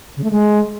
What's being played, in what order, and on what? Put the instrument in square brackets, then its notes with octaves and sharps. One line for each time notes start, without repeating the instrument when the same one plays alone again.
[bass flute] C#3
A3
G#3